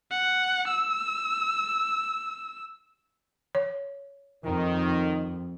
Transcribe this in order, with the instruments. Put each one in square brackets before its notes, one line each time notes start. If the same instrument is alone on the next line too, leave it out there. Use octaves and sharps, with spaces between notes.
[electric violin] F#5
E6
[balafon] C#5
[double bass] F2 [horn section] D#3